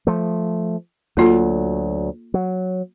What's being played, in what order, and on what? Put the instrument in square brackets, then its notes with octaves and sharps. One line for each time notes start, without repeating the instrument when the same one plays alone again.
[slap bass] F3 A3
[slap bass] D2 F#3 [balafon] A#3 F4 A4
[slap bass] F#3